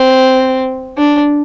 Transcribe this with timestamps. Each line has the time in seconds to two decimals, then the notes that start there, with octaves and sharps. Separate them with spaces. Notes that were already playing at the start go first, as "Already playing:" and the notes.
Already playing: C4
0.97 D4